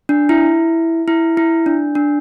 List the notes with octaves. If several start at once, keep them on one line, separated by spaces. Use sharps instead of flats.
D4
E4
E4
E4
D4
D4